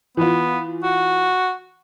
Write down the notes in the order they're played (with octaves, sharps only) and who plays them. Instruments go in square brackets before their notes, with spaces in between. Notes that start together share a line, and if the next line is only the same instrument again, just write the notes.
[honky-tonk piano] E3 F4 [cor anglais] B3
[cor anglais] F#4